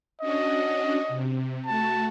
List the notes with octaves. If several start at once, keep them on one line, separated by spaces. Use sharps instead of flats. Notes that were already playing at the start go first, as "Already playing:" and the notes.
C#4 D4 F#4 D#5
C3
A3 F#4 A5